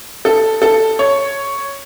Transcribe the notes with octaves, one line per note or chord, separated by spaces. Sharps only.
A4
A4
C#5